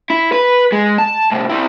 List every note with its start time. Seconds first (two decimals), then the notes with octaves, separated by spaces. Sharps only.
0.10 E4
0.32 B4
0.72 G#3
0.98 A5
1.32 A2 C3
1.50 C4 E4